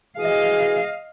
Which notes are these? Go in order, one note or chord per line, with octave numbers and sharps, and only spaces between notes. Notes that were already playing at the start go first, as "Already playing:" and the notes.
E3 F#4 G#4 D#5 F5